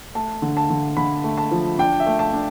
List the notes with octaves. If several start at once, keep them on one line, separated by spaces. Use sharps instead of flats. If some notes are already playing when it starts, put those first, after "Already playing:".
A3 A5
D3
A5
D3
D3 B5
A3
A5
F3
D4 G5
E5
A3
A5
D4